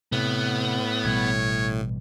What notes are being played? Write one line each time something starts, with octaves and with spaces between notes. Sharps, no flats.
A2 C3 B3
A1 B2 G3 C#5